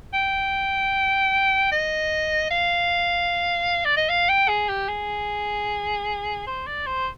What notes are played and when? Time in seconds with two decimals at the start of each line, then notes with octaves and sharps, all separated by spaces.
0.14 G5
1.72 D#5
2.51 F5
3.85 D5
3.97 D#5
4.09 F5
4.29 G5
4.48 G#4
4.68 G4
4.88 G#4
6.47 C5
6.67 D5
6.87 C5